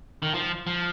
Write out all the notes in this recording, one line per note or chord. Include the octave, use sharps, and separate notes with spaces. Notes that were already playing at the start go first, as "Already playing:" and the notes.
D#3
F3
F3